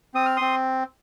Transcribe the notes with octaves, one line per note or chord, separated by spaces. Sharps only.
C4 D#6
F6
C4 C6 D#6